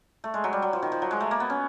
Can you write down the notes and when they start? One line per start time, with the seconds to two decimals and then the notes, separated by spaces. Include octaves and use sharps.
0.24 A3
0.34 G#3
0.44 F#3
0.53 G3
0.62 F#3
0.73 F3
0.82 D#3
0.92 F3
1.02 F#3
1.11 G#3
1.20 A3
1.31 A#3
1.40 B3
1.50 C#4